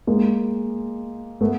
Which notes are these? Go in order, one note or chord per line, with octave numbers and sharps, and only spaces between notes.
G#3 A#3
A3 B3